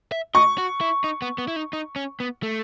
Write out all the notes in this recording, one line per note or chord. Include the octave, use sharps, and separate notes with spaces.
E5
D#5 C#6
F#4
E4
D#4
B3
B3
E4
D#4
D#4
C#4
B3
A3